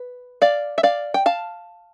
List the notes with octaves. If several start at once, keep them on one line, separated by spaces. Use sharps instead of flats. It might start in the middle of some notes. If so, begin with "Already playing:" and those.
Already playing: B4
D5 F5
E5
D5 F5
G5
F5 A5